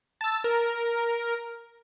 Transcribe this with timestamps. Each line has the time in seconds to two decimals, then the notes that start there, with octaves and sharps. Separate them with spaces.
0.21 A5 E6
0.44 A#4